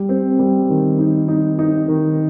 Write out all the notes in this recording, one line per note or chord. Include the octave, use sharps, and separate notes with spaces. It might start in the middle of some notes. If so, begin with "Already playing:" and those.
Already playing: G3
C4
G3
D#3
D#4
D#4
D#4
D#3